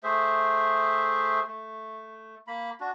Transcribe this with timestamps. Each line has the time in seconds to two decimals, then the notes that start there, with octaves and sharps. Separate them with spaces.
0.04 A3 G#4 C5 E5
1.47 A3
2.47 A#3 B5
2.80 D4 F#4